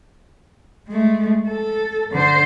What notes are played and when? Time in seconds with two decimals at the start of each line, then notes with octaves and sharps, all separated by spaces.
0.88 G#3 A3
1.48 A4
2.11 D3 C5